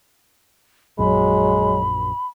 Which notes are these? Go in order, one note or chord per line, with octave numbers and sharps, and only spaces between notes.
A#1 F#2 F#3 G#3 B5